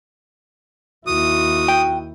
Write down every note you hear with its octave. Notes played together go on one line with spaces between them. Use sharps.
D#2 E4 F#4 D#6
G5